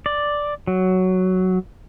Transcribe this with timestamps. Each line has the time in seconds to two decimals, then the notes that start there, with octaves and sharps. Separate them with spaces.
0.06 D5
0.67 F#3